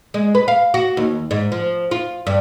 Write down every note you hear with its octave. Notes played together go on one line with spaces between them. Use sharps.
G#3
B4
F5
F#4
D#2
G#2
F3
F4
G2